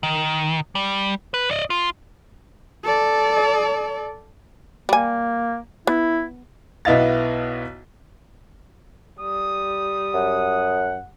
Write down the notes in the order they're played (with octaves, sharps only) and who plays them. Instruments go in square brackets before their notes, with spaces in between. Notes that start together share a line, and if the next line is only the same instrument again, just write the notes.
[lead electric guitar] D#3
G3
B4
D5 D#5
F4
[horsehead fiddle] A4 D5
[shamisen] G3 G#5 [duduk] A#3
[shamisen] B3 [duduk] E4
[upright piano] B1 B3 E4 D#5 F5 A6
[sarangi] G3 [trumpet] D#6
[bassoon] F#2 [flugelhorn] F#5